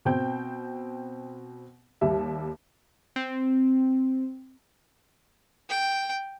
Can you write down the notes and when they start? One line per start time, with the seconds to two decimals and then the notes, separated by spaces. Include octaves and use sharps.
0.05 B2 C4 G5 G6
2.01 D#2 G3 E5
3.16 C4
5.69 G5